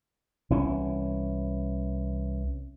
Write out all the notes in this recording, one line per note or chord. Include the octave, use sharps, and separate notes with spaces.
C2 E3 C#4